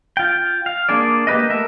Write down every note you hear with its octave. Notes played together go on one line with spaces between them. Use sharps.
F4 G5
F5
A#3 D4 G#4 D5
A#3 G4 B4 D#5
A3 A#4 E5